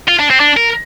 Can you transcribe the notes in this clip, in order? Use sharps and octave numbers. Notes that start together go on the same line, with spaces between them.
F4
D4
C4
D4
A#4